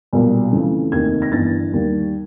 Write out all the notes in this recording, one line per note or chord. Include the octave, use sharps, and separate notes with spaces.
B1 A#2 G3
F2 C#3 E3 A3
F1 D#2 D#3 G#6
A#6
G1 G2 E3 A6
D#2 D#3 G3 A#3